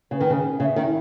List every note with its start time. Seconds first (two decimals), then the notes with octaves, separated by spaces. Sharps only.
0.11 C#3 B4
0.21 D#3
0.30 C#3
0.35 C#4
0.60 C#3 E5
0.76 D#3
0.84 E4